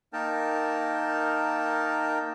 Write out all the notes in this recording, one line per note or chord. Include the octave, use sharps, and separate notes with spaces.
A#3 D#4 A#4 G5 A5